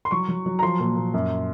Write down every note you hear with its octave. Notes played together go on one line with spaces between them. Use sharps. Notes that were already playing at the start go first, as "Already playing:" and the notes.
C6
F#3 C#6
F#3
F#3
A#5
F3 C6
A#2
A#2
F#2